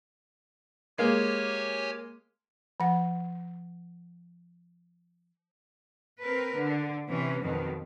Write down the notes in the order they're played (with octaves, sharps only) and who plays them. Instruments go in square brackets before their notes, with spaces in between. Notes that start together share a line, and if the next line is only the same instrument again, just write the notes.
[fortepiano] G#3 A#3 [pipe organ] G4 C#5 G#5
[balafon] F3 F#5
[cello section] C4 A#4 B4
D3
C3 E3 C#4
F2 B2 D#3 F#3